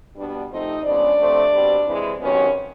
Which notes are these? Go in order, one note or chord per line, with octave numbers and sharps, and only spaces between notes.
B2 G3 B3 D4
C3 F3 A3 C4 D#4 D#5
C#3 F3 G#3 B3 D4 D5
C3 F3 A3 C4
B2 G3 C4
C3 E3 G#3
C3 D#3 F#3 B3 C#4 C#5